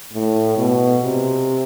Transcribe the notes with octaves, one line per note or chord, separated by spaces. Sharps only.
A2
B2
C3